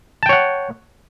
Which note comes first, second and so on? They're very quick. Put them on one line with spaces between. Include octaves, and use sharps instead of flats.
A5 G5 C#5 F#5